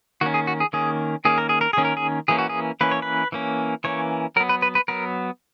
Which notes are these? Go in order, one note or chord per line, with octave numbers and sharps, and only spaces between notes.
D#3 A#3 C#4 F#4
G#4
F#4
G#4
D#3 A#3 C#4 G#4
D#3 A#3 C#4 G#4
A#4
G#4
A#4
D#3 A#3 C#4 G#4
A#4
G#4
E3 A#3 C#4 G#4
F#4
G#4
E3 A#3 C#4 B4
C#5
B4
E3 A#3 C#4
E3 A#3 C#4 C#5
F#3 B3 A#4
B4
B4
B4
F#3 B3 A#4